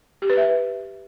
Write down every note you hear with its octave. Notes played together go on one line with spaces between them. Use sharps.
G4
B4
E5